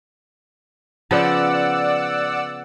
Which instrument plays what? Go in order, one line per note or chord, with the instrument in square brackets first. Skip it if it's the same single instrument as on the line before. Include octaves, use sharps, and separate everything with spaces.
[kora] C#3 F3 B3 [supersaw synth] D5 F#5 E6